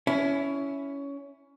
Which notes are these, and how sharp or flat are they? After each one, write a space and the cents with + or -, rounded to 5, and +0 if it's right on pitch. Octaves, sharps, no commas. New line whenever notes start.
C#4 +15 E4 +0